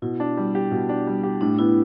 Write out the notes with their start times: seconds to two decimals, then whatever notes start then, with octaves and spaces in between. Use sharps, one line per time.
0.02 B2 E4
0.20 D4
0.37 G3
0.55 G4
0.72 B2
0.89 D4
1.07 G3
1.23 G4
1.41 A2 D4
1.59 B3 E4